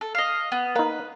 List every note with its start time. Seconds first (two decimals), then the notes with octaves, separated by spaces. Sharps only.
0.01 A4
0.15 D#5 F5
0.52 B3
0.76 A#3 D#4 B4